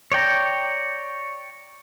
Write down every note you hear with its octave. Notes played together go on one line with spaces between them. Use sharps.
C#5 D5 G5 A#5